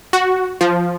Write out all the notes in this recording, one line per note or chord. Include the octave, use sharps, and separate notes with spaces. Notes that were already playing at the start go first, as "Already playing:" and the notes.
F#4
F3